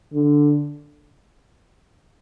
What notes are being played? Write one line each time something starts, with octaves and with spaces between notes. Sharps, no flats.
D3